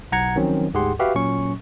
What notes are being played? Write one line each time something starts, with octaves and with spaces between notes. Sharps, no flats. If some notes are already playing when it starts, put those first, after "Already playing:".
B1 F#5 A#5 G#6 C#7
D#3 F3 F#3 C4 C#4
D2 G#2 G4 G#4 F#5 C6
F#4 G4 B4 E5 F5
A#2 F#3 C#4 C#6